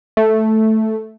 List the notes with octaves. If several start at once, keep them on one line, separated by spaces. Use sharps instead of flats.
A3